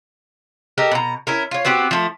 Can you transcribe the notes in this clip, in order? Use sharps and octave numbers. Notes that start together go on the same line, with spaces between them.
D#4 G4 A4 A#4
B2 A#5
C#4 E4 A#4
F4 C#5
B3 C4 F#4 G4
F3 A3